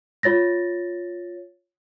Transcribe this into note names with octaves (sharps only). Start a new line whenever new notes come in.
F4 C#5 A6 A#6